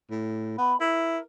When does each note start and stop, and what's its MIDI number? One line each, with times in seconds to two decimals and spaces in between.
0.11 0.55 45
0.58 0.74 59
0.58 0.79 83
0.80 1.19 64
0.80 1.23 70